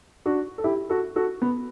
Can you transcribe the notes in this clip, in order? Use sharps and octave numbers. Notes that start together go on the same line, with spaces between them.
D4 F#4
A4
E4 G4
F#4 A4
F#4 A4
B3